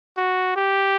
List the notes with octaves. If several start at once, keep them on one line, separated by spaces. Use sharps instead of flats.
F#4
G4